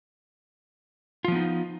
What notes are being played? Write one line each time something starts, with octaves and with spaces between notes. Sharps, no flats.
F3 B3 D#4 F4